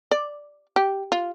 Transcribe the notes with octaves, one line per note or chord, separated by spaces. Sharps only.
D5
G4
F4